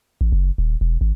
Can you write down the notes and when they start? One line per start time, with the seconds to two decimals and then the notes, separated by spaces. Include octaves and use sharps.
0.21 A1
0.32 F#1
0.58 D#1
0.81 E1
1.01 G#1